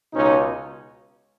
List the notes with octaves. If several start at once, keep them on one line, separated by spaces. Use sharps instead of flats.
C#2 B2 C#4 D#4